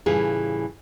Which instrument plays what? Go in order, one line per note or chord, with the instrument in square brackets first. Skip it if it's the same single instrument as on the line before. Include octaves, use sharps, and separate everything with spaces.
[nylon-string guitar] A2 C#3 E3 G3 F4 G#4